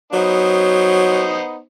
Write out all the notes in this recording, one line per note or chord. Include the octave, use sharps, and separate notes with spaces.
F#3 B3 D#4 C5